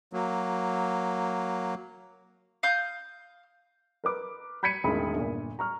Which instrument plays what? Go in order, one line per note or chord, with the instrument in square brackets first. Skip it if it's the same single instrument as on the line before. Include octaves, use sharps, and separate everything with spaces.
[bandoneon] F#3 A#3
[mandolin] F5 D#6 G6
[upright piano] A#4 B4 D6
B5 G6 G#6 B6 C#7 D#7
E1 A1 D#3 B5
G1 A#2
A#5 C#6 F6